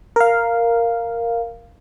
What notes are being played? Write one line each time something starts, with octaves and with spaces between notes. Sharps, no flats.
A#4 F5